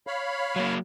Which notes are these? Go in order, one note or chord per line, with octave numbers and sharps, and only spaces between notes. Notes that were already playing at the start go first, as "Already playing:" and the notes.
C#5 F5 B5
F#3 A#3